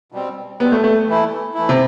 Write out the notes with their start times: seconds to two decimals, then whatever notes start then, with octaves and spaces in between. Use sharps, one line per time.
0.12 B2 G3 C4
0.60 B2 G3 B3 C4
0.72 A3
0.84 A3
1.08 E3 A3 E4
1.54 E3 A3 E4
1.69 C3